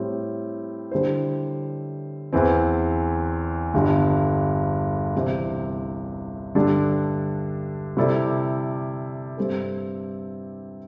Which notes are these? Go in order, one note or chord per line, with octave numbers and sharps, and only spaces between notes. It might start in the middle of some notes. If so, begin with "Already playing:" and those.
Already playing: A2 G3 C4
D3 G3 E4 C5
E2 E3 C4
G1 G2 D3 G3
C2 C3 E3
G2 D3 G3 D4 A4
C3 G3 E4 A4 D5
G2 G3 C4 A4